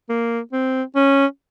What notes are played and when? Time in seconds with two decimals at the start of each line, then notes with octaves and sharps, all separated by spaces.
0.09 A#3
0.52 C4
0.95 C#4